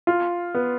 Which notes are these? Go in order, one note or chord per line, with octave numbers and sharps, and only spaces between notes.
F4
B3